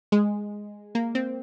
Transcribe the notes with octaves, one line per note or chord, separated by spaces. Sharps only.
G#3
A#3
C4